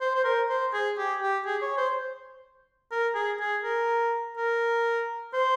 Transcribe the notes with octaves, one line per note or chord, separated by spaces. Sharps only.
C5
C5
A#4
C5
G#4
G4
G4
G#4
C#5
C5
A#4
G#4
G#4
A#4
A#4
C5